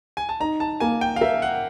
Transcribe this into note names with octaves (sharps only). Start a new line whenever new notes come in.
G#5
A5
D#4 A#5
A5
A#3 G#5
G5
F5
A#4 E5
F#5